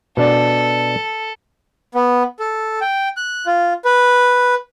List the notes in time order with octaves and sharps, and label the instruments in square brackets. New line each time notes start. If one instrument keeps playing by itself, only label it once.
[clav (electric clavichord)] B2 D4 D5 [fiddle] A4
[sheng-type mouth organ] B3
A4
G5
F#6
F4
B4